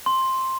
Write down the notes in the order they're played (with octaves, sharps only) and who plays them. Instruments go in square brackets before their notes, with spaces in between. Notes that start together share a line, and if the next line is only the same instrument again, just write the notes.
[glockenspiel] C6